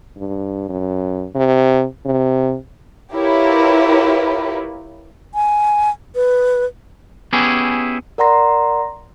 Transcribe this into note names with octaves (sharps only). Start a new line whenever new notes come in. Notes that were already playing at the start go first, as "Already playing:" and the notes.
G2
F#2
C3
C3
E4 F4 G4 A#4 B4 C#5
G#5
B4
B3 C#4 E4 G4 G#4
A#4 D5 F#5 A#5 C6 A#6